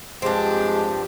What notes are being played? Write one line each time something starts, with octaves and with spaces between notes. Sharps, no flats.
G2 F3 G#3 C4 D4 G4